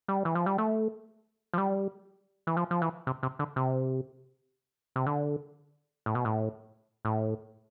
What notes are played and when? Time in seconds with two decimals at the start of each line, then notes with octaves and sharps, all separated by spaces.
0.08 G3
0.25 E3
0.35 F3
0.46 G3
0.58 A3
1.54 F3
1.58 G3
2.47 E3
2.57 F3
2.71 F3
2.82 E3
3.07 C3
3.23 C3
3.39 D3
3.56 C3
4.96 C3
5.06 D3
6.06 A2
6.15 B2
6.25 A2
7.05 A2